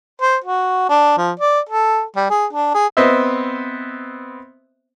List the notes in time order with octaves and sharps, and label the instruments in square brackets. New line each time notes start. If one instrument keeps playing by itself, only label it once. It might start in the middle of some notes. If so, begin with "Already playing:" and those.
[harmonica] C5
F#4
D4
F3
D5
A4
G3
G#4
D4
G#4
[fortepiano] B3 C4 C5 D#5 E5